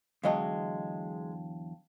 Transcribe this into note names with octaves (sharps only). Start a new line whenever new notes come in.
E2 D3 F#3 G#3 D#5 F5 G5 A5